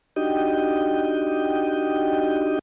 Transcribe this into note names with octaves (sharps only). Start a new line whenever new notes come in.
D4 D#4 F#4 G4 D#5 G5